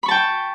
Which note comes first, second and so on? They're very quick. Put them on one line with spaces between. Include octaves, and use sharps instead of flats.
B5 C#6 A5 G5